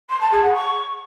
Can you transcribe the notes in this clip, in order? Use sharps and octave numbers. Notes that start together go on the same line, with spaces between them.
C6
A5
G#4
F#5
C#6